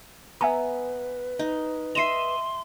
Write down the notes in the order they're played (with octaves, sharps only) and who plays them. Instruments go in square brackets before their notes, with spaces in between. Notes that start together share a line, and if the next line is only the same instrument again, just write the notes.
[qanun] B3 [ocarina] B4 [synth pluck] E5 G#5 A#5
[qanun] D#4
[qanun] D#5 E5 [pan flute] C6 [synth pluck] C7 D#7 E7